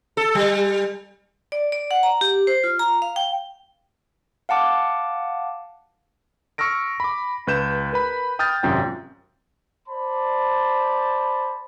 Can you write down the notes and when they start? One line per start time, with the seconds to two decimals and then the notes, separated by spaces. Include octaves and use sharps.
0.17 A4
0.35 G3
1.52 D5
1.72 D5
1.91 F#5
2.03 A#5
2.21 G4
2.47 C5
2.64 F4
2.79 A#5
3.02 F5
3.16 G5
4.49 F5 F#5 A5 D6
6.58 C#6 E6 F6 A#6 D7
7.00 B5 D6
7.47 C#2 B4 G6 E7
7.93 A#4 B4 B5
8.39 G5 D#6 F6 G6 A6
8.63 G#1 F#2 C3 F4 G5
9.88 C5 D5 A5 B5